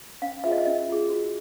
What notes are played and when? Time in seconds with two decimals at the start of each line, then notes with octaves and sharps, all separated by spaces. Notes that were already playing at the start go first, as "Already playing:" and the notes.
0.22 C#4 F5
0.44 F4 G#4 E5
0.52 D#5
0.58 E5
0.66 C#4 D#5
0.89 F4 G#4
1.10 F#4